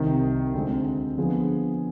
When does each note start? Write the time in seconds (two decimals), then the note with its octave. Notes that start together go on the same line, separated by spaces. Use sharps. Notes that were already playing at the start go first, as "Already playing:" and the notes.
Already playing: C2 C3 D#3
0.54 D2 D3 G#3 C4
1.17 D3 F3 B3 F4 G#4